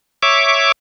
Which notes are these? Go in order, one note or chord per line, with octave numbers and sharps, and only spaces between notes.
C#5 E5 D6